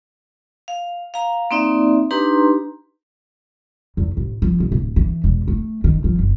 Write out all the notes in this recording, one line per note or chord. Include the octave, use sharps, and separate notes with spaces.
F5
F5 A#5
A#3 C4 D#4 D5 E5
D4 D#4 G4 B4 A#5 C6
E2
A1
F3
A1
D1
E3
E1
A3
D#3
F3
F#1